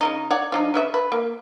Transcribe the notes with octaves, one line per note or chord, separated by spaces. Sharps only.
C#3 E3 D#4
C#5 D5 F#5
F3 D4 D#4
C#3 B4 E5
B4
A#3